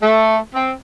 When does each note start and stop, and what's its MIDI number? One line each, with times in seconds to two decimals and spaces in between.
0.01 0.37 57
0.54 0.72 60